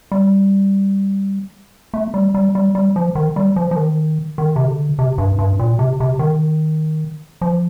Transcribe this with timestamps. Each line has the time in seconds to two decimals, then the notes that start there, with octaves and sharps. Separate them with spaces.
0.12 G3
1.94 A3
2.14 G3
2.34 G3
2.55 G3
2.75 G3
2.96 F3
3.15 D#3
3.36 G3
3.56 F3
3.71 F3
3.76 D#3
4.38 D#3
4.56 C3
4.68 D3
4.99 C3
5.18 G2
5.39 G2
5.59 A#2
5.79 C3
6.00 C3
6.19 D#3
7.41 F3